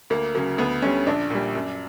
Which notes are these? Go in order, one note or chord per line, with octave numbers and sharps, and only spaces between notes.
D2 A#3
C#3 F#3 A#3
D2 B3
D3 G3 C#4
A#1 D4
A#2 G3
F#2